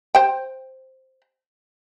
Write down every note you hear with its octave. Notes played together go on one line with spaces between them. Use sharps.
C5 G5